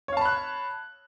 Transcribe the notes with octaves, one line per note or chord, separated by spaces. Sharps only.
C#5 F5 A5 B5 F#6